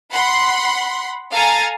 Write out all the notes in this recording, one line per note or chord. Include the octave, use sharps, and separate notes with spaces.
F#5 B5 C6
A4 F5 G#5 A#5 A6